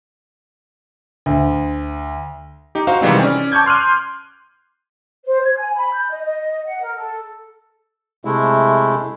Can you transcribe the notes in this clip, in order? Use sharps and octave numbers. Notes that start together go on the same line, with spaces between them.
D2
D#4 G4
D#4 F#4 C5 F5
C3 D#3 E3 G3 G#3 C4
C#4 D5
A5 C#6 D6 G6 G#6
C6 F6 F#6 D#7
C5
G#6
G#5
B5
G6
D#5
D#5
F#5
A#4
A4
C3 G#3 A3 E4